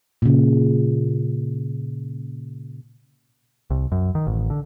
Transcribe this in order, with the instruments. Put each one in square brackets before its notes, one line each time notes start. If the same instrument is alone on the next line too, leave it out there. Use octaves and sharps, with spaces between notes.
[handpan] A#2 C#3
[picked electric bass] C2
F#2
D#3
A1
D3